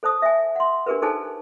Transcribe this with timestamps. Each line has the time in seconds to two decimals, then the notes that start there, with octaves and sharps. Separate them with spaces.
0.03 A4 C5 A5 D#6
0.22 E5 G#5
0.56 F#5 C6
0.86 D4 G4 G#4 A#4 B4
1.02 D#4 G#4 A4 C5 G#5 A5